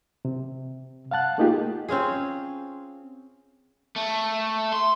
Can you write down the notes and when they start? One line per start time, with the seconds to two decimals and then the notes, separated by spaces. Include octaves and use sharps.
0.25 C3
1.11 F5 F#5 A5 F#6
1.38 A3 A#3 D#4 F4 G4 G#4
1.89 C4 C#4 F4 G#4
3.96 A3
4.73 C6